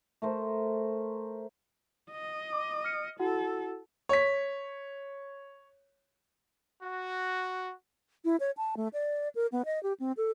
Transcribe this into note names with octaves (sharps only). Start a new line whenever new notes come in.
A3 A#4 C5
D#5
D6
F6 C#7
E4 F#4 A4 F#5
C#5 B6
F#4
E4
C#5
A5
A3
D5
A#4
B3
D#5
G4
C4
A4